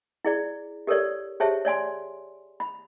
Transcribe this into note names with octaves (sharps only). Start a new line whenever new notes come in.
E4 G#4 D5
G4 A4 A#4 C#5 D5
G4 G#4 C5 C#5 E5 A5
C#5 D5 G#5 C6
B5